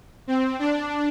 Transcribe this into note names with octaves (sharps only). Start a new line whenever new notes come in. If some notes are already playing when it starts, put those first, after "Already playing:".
C4
D4